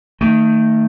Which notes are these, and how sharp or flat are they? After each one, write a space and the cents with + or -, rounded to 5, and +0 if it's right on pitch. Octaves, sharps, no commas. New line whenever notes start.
D#3 +0 A3 +25